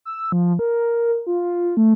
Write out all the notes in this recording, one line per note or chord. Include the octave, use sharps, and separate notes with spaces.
E6
F3
A#4
F4
A3